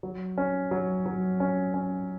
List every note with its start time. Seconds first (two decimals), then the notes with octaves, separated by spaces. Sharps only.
0.03 F#3
0.38 C#4
0.71 F#3
1.06 F#3
1.40 C#4
1.74 C#4